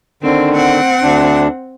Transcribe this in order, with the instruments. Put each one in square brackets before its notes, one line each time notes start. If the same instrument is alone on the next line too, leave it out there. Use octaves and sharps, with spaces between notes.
[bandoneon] D3 D#3 [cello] C4
[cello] C4 F#5
[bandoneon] D2 D4